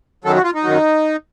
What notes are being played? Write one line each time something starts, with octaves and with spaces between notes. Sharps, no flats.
F#2 D#3 F#3 A4
F#4
F4
D#4
F#2 D#3 F#3